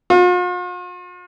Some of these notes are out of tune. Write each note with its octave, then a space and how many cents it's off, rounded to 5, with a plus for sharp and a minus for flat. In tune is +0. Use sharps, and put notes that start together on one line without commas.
F4 +45